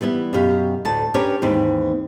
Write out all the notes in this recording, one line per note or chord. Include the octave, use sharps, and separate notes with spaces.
E3 G3 B3 E4
F#2 B2 G4 F5
D2 A2 A5
C#4 D4 G4 A#4 B4 C#5
D#2 G#2 E3 C4